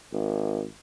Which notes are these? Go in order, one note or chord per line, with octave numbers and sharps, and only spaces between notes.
G#1